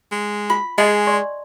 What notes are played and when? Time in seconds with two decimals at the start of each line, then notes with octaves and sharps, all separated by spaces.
0.12 G#3
0.50 F4 B5
0.78 G#3 G#4 D#5 G5 G#5
1.07 D5 C6 C#6